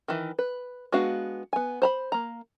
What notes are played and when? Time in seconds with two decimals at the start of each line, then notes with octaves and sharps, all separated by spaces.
0.08 D#3 E3
0.39 B4
0.92 G#3 B3 D4 F#4 F5
1.53 B3 G#5
1.82 C5 A#5 B5
2.12 A#3 A#5